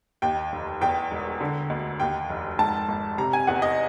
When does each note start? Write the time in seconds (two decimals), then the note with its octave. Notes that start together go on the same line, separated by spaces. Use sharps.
0.22 D#2 G5
0.52 F1
0.81 E2 G5
1.11 E1
1.41 D3
1.70 D2
2.00 D#2 G5
2.30 F1
2.59 G#2 A5
2.88 G#1
3.18 C3 A#5
3.33 G#5
3.47 E2 F#5
3.62 D#5